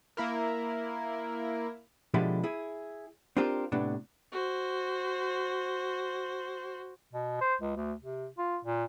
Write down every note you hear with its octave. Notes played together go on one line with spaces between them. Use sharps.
A#3 E4 A#4
B2 D3 F3 G#3 E4 G4
E4 G#4
C4 D4 F4 G4 A#4 C5
A2 C3 B3 D4
F#4 C5
B2
C5
C#2
D2
C3
F4
A#2